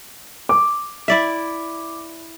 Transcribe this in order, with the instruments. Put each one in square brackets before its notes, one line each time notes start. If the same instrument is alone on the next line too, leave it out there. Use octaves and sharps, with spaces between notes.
[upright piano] D6
[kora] E4 D5 E5